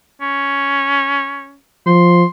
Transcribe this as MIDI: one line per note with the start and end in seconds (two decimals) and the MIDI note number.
0.21 1.57 61
1.86 2.24 53
1.86 2.26 84